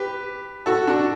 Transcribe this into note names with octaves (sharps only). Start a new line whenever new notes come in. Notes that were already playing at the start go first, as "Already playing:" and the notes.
Already playing: G4 B4
F#4 A4
D4 F#4